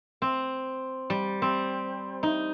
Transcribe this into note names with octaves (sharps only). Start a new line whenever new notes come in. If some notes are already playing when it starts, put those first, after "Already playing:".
C4
G3
C4
D#4